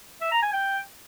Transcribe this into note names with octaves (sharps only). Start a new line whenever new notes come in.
E5
A#5
G#5
G5